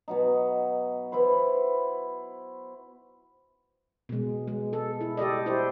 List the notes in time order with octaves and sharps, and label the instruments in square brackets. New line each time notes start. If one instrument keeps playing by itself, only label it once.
[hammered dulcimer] B2 F#3 D#4
E4 F#4 B4 C5
[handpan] B2 G#3
G#3
A4
E4
G4 A4 D5 D#5
E4 G4 C5